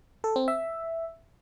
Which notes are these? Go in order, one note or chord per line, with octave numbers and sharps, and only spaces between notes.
A4
C4
E5